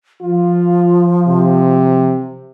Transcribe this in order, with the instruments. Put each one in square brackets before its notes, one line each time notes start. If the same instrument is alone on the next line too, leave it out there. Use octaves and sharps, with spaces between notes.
[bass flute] F3 [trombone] F4
[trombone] C3